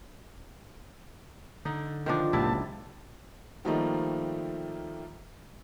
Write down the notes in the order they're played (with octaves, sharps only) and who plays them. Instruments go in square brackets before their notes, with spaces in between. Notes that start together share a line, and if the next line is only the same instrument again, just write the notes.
[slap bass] D3 [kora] D#4
[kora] D#3 F3 D4
[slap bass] F#1 C#2 [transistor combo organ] A#2 G4 A5 [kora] E4
[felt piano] D#3 F3 G3 A3 A#3 D#4